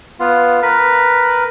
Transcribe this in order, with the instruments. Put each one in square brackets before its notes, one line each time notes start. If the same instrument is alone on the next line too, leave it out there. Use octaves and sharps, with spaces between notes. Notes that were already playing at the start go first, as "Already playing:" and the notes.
[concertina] B3 F4
A#4 B4